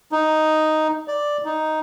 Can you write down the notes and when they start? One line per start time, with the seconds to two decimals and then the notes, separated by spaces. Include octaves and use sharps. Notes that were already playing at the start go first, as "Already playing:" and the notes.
0.12 D#4
1.08 D5
1.45 D#4